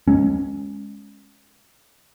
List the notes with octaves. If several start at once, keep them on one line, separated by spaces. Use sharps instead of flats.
G#3 C#4